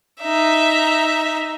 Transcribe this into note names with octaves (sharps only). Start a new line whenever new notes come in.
D#4 E5